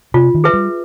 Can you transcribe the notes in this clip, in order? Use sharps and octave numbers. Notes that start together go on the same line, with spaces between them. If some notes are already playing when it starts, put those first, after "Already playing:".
C3 F4
D#3
G#4 B4 E5
G3